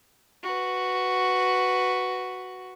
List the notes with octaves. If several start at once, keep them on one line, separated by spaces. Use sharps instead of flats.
F#4 B4